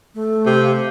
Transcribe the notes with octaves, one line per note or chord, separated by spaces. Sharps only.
A3
C3
F5